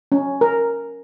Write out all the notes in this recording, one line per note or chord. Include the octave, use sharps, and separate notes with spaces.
C#4
A#4